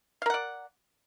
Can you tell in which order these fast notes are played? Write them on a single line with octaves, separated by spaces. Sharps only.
F5 A#4 F#5 D5